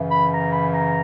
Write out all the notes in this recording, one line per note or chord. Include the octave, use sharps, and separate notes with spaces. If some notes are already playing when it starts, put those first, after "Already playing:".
Already playing: F#2 C#3 E3
B5
A#5
B5
A#5